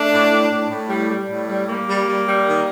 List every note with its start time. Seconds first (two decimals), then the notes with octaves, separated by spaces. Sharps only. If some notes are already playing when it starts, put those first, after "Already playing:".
Already playing: A3 D4
0.12 A2
0.31 A2
0.50 A2
0.70 A2
0.89 G3
1.09 G3
1.29 A2
1.48 G3
1.68 G3 A#3
1.88 G3
2.07 G3
2.27 G3
2.46 D#3